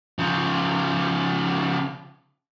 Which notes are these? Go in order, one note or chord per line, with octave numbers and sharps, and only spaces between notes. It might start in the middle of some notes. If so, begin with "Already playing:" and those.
C#3 F3